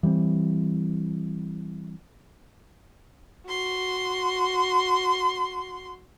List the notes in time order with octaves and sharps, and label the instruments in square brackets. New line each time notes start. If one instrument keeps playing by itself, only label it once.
[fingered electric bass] E3 G3 G#3 C4
[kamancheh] F#4 C6